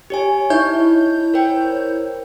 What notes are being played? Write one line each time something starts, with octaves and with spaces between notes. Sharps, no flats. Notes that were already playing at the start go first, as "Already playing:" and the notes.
G4 C#5 G#5
D#4 E4 C#5 G6
A#4 C5 G5